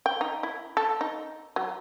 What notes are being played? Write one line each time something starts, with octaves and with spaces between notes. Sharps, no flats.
G5
D#4
E4
A4
D#4
F#3